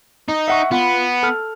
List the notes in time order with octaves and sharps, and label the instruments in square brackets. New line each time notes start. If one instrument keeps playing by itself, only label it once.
[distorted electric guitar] D#4
[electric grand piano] E5 F#5 C#6
[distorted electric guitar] B3 [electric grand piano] F4 F#5 B5
[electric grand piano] A4 F6